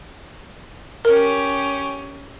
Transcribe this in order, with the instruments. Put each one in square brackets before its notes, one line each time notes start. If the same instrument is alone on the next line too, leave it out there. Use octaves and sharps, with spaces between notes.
[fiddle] C#4 G4 [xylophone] A#4